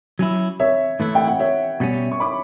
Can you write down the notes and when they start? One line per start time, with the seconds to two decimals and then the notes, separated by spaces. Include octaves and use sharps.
0.19 F#3 C#4 E4
0.60 C#5 E5
1.00 A2 E3 A3 E4
1.15 G5
1.27 F#5
1.40 C#5 E5
1.80 B2 G3 C#4
2.11 C#6
2.20 B5 D6